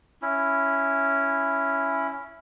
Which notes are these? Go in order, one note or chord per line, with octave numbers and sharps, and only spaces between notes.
C#4 E4